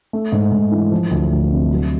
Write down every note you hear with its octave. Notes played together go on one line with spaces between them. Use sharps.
A3
G#2
G#2
E3
F3
D2
D2
C3
F#3